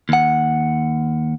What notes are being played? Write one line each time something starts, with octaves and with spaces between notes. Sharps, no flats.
D#2 F#5